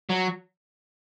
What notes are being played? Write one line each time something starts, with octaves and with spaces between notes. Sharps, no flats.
F#3